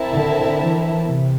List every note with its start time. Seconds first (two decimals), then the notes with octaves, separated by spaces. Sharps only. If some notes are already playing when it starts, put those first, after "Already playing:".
Already playing: C4 E4 A#4 E5 A5
0.12 D3
0.60 E3
1.07 C3